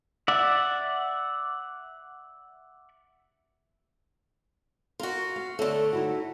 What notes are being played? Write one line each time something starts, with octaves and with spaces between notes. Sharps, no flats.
D5 E5 F#5
F4 F#4 A#4
F5
D3 A3 A4 C#5
D#4 E4 F#4